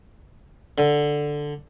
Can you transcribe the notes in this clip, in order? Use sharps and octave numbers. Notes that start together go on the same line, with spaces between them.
D3